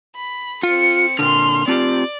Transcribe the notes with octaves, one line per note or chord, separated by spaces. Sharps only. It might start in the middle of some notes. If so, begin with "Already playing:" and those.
B5
C4 F4 C#7
A#2 D3 C6 F6
C4 F4 G4 D5